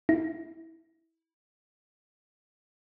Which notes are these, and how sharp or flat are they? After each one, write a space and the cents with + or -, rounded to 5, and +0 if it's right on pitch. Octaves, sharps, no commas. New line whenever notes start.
E4 -15